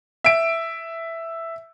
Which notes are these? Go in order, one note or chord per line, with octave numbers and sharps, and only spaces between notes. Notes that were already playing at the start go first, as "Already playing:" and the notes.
E5 D7